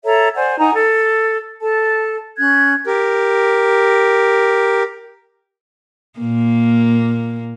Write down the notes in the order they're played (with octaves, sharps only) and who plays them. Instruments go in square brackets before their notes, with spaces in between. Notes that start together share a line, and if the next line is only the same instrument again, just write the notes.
[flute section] A4 C#5 E5 A#5
C5 D5 F#5 G#5
D#4 F#5 G#5 A#5
A4
A4 A5
C#4 F#6 G#6
[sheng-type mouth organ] G4 A#4
[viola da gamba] A#2 A#3